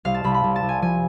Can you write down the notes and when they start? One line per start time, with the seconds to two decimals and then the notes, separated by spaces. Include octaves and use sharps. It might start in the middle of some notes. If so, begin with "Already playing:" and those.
0.05 C2 F5
0.14 A5
0.24 C2 B5
0.34 B5
0.44 C2
0.56 A5
0.63 C2
0.69 G#5
0.82 F3 G#5